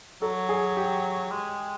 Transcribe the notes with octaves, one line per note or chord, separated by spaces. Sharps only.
F#3 A4
G#4
G4
G#3